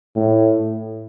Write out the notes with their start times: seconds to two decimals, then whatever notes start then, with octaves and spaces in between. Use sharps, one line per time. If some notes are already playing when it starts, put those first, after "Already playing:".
0.16 A2